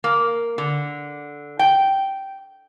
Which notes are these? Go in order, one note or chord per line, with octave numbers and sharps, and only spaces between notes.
A#3
D3
G5